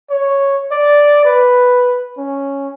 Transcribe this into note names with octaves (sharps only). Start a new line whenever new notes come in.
C#5
D5
B4
C#4